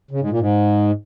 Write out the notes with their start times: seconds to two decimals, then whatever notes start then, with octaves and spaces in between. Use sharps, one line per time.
0.11 C#3
0.20 G#2
0.30 A#2
0.39 G#2